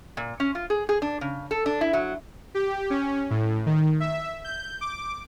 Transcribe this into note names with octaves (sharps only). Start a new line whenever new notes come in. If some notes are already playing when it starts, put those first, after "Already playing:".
A#2
C#4
F4
G#4
G#4
D4
C#3
A4
D4
E4
F#3
G4
C#4
A2
D#3
E5
G6
D6